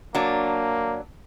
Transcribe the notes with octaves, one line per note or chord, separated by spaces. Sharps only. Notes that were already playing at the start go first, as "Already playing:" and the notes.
F#3 A#3 D4